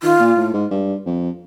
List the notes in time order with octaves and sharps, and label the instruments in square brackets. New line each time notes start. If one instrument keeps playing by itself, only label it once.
[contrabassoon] D#3 [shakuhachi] F4
[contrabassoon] A#2
A2
G#2
G2
F2